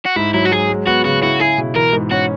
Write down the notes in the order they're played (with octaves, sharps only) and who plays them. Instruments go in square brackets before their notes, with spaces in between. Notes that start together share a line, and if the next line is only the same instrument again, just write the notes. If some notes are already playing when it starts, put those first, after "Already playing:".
[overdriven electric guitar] F#4
[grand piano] G#2 [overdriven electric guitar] E4
[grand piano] F#3 [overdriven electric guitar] E4
[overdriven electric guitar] F#4
[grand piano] F#3 [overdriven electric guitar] G#4
[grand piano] G#3
[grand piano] B3 [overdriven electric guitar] F#4
[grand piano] C#3 [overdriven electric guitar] F#4
[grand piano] E4 [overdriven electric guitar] F#4
[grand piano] E4 [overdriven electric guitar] G#4
[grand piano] B2
[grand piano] E3 [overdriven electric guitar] A#4
[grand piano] G#2
[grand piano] C#4 [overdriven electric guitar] F#4